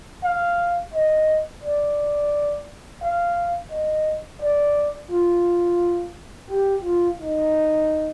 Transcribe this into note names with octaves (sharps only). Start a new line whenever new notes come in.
F5
D#5
D5
F5
D#5
D5
F4
G4
F4
D#4